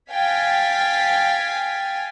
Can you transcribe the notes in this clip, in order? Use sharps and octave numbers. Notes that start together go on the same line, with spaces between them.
F5 G5 G#5 G#6 A6 B6